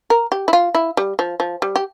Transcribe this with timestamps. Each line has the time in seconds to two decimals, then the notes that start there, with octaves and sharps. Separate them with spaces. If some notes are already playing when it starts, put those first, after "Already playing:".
0.10 A#4
0.32 G4
0.48 E4
0.53 F4
0.75 E4
0.97 G3
1.19 F3
1.40 F3
1.62 G3
1.76 G4